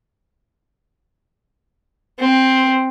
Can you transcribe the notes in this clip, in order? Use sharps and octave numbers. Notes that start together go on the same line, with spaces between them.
C4